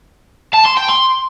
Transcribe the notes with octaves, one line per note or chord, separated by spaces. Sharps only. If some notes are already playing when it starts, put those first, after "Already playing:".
A5
C6
G5
C6